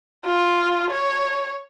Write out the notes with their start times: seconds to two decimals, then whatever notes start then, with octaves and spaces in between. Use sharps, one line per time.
0.25 F4
0.90 C#5